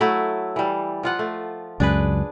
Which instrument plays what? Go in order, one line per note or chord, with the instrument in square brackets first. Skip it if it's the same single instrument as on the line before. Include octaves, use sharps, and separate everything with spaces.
[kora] F#3 A3 E4
E3 G3
F3 F4 F#5
A3
[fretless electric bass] C#2 F#2 [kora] D4 G#4 B4